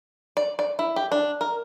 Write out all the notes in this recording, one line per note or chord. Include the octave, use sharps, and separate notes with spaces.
D5
D5
E4
G4
D4
A#4